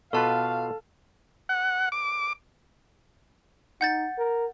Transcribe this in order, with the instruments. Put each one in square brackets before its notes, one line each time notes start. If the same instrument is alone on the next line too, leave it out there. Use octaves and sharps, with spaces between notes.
[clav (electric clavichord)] B2 F4 B4 [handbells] A4 A5 [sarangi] F5
[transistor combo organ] F#5
D6
[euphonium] D#4 [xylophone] F#5 G6 A6
[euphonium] A#4